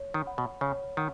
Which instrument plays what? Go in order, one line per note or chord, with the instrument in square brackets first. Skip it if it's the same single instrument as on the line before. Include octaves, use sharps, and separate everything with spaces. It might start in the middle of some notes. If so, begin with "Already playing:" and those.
Already playing: [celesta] C#5
[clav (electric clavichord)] D#3
[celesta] F#5 B5
[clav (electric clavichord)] B2
[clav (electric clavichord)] C#3 [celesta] C#5
[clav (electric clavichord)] D#3 [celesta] F#5